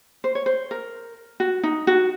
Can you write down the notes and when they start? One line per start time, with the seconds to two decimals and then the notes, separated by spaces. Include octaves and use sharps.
0.24 C5
0.35 C#5
0.46 C5
0.71 A#4
1.40 F#4
1.63 D#4
1.87 F#4